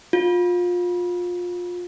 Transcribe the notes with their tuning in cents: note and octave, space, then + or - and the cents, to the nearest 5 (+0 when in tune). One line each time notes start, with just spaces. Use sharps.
F4 +25